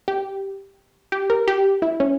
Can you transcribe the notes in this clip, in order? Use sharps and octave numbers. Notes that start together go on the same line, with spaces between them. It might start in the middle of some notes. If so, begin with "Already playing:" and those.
G4
G4
A#4
G4
E4
C#4